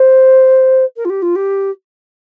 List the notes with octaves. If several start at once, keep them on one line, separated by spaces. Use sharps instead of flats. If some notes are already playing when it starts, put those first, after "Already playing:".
Already playing: C5
A#4
F4
G4
F4
G4